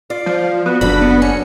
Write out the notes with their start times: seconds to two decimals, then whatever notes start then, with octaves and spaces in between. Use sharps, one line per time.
0.10 F4 D5
0.26 F3
0.66 B3 F#4
0.81 F#1 A#2 D4 A4 D5 B5
1.01 B3
1.22 F#3 C#4 C#7